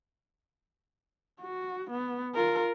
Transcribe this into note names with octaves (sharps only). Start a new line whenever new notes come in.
F#4
B3
F4 A#4